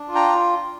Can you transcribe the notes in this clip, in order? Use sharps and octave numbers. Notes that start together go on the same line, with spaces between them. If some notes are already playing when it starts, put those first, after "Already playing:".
Already playing: D4
F4
G5 A#5